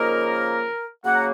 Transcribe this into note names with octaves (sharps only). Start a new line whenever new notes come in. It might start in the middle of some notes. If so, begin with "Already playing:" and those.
Already playing: C#3 F3 A#3 D#4 A#4
C#3 F#3 A#3 F#5
A#5